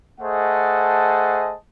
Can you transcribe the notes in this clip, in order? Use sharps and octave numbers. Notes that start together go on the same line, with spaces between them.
A3 G#4 C5 D#5 F#5 A5